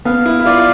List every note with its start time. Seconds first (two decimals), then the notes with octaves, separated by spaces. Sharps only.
0.05 B3 F5
0.26 E4
0.40 E4
0.46 F4 D5